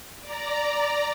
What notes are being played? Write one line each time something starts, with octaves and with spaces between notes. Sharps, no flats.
D5 A#5